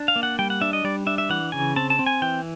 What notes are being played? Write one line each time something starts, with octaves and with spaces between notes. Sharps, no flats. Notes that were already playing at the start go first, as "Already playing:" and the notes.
Already playing: D4
F5
A#3
F#5
G3 G5
F#5
D4 E5
D#5
G3 D5
D4 E5
E5
E3 F#5
C#3 G#5
C4 A5
A5
C4
G#5
E3 G5